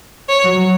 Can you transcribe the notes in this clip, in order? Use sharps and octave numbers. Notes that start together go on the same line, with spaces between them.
C#5
F#3